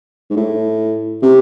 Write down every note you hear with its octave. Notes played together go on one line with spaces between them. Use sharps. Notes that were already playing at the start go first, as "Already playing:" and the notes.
G#2
A2
C3